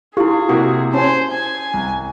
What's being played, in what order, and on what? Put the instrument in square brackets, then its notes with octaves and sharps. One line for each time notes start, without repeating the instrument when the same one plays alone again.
[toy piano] E4 G4 [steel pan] F4 [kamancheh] G#4
[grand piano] C3 A#3 [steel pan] F#4
[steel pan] C#4 [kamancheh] C5 [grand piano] A5
[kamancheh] G#5
[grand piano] C2